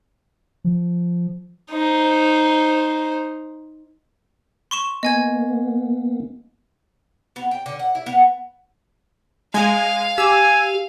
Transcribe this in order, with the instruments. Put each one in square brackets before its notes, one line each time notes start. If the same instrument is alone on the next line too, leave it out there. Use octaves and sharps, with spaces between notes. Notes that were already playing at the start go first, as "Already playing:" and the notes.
[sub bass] F3
[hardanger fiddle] D#4 C5
[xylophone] C6 C#6 E7
[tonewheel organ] A#3 B3 [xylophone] D#5 G#5 G#6
[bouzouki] B3
G5
D3
F#5
E4
B3
[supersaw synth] G#3 G#5 [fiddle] F5
[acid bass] G4 [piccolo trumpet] G#5 [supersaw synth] E6